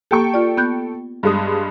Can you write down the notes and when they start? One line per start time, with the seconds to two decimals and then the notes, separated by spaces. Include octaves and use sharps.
0.11 A#3 G4 A4 G5 C#6
0.34 F4 D5
0.57 B3 F#6 G6
1.23 G2 G#3 D#6